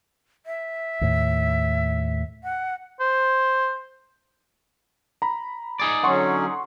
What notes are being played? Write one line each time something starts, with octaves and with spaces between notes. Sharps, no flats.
E5
D#2 A2
F#5
C5
A#5 B5
D#4 G#4 D5
D3 F#3 C#4 F#5 C6 C#6